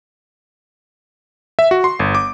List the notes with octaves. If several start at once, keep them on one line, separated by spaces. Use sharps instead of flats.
E5
F#4
C6
G1
D6